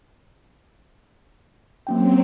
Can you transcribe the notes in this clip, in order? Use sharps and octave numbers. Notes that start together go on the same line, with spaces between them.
F#3 A#3 C4 C#4 G5